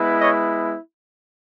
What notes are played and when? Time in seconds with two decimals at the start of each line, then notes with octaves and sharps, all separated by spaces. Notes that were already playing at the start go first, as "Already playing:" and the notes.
Already playing: G#3 B3 E4
0.20 C#5 D#5